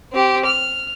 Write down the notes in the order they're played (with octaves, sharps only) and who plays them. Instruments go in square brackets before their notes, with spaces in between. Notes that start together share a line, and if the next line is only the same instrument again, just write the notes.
[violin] C4 G4
F6